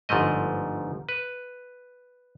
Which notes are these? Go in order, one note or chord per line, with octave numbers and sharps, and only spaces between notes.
G1 G#2 F3 A3 D#5
B4